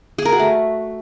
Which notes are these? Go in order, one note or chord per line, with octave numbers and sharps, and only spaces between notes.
G#4
A#4
F#4
A3